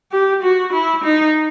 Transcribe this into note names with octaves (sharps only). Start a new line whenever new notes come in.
G4
F#4
E4
D#4